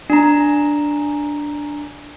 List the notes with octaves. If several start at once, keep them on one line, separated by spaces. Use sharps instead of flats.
D4 A#5